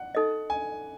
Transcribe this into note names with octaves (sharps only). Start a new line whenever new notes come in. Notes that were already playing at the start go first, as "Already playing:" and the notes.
Already playing: F#5
D#4 A4 D#5
G#5